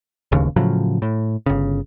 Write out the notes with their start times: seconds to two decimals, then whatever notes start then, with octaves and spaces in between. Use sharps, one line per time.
0.32 D1 A1 D#2 C#3
0.56 A2 C#3 F3 F#3
1.02 A2
1.46 G1 C#3